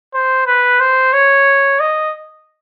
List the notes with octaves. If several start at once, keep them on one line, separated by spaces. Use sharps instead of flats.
C5
B4
C5
C#5
D#5